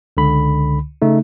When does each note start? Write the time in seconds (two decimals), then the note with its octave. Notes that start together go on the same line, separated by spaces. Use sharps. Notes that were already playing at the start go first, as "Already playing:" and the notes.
0.17 C#2 D3 B5
1.02 C#3 A3 D#4